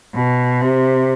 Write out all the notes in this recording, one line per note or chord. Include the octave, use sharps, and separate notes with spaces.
B2
C3